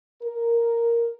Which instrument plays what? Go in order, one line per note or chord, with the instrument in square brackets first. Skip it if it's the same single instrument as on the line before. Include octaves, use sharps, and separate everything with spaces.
[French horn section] A#4